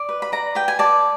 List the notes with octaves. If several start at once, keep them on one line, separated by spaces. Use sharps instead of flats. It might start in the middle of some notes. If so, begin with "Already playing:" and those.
Already playing: D5
B4
B5
D5 A#5
B4 G5
G#5
D5 A5